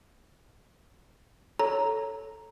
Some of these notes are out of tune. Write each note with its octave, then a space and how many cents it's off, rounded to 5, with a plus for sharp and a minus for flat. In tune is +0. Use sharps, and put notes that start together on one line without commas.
A4 +0 C#5 +0 A#5 +0